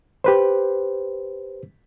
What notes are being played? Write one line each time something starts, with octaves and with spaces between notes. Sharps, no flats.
G4 B4 C5